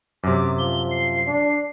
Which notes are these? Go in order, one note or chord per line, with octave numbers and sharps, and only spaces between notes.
F#2 C3 D6
F3 G7
C7
D4